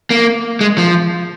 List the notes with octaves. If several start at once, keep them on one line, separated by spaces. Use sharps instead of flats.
A#3
G#3
F3